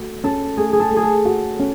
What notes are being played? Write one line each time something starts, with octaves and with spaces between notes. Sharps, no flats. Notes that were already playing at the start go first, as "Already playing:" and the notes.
Already playing: A3 F#4
C#4 A4
A3 G#4
G#4
A4
A3
G#4
A4
F#4
C#4